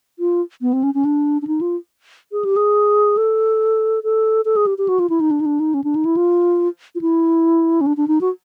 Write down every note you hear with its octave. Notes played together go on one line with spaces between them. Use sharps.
F4
B3
C4
C#4
C#4
D4
D4
D#4
F4
G#4
G4
G#4
A4
A4
A4
G#4
G4
G4
F#4
F4
E4
D#4
D4
D#4
D4
D#4
C#4
D4
D#4
E4
F4
F4
E4
C#4
D4
D4
D#4
F#4